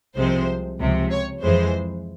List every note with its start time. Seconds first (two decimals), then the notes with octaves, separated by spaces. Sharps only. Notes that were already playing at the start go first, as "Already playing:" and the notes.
0.16 C2 C3 F3 G#3 C5
0.79 C#2 C3 F3
1.11 C#5
1.42 F2 E3 G#3 C5